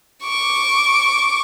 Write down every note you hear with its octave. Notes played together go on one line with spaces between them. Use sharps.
C#6 D6